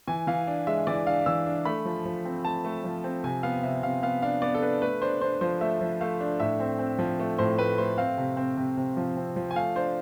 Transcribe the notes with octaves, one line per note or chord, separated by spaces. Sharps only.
E3 G#5
E3 F5
D4
G#3 E5
E3 D5
D4 F5
E3 E6
D4
A3 B5
F3
F3
C4
A3 A5
A3
F3
C4
C3 G#5
B3 F5
C3 E5
C3 F5
B3 F5
D4 F5
B3 D5
A4
D4 B4
A3 B4
D4 C5
D4 C5
F3 C5
A3 E5
F3
A3 F5
D4
A2 E5
C4
C4
F3
A3
A2 C5
A3 B4
A3 C5
C4 F5
C3
C4
C3
C3
F3
C4
F3
G#5
A3 F5
D4 C5